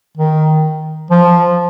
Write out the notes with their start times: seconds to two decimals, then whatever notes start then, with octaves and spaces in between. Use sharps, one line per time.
0.17 D#3
1.11 F3